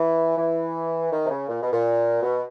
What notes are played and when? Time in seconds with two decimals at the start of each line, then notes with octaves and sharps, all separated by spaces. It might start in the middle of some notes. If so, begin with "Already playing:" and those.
Already playing: E3
0.37 E3
1.12 D#3
1.24 C3
1.31 C#3
1.48 A#2
1.61 B2
1.72 A#2
2.22 B2